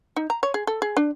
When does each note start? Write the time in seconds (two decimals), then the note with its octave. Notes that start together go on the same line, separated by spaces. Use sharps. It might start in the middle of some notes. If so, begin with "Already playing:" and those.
0.16 D#4
0.30 A#5
0.43 C#5
0.54 G#4
0.67 A4
0.82 G#4
0.97 D4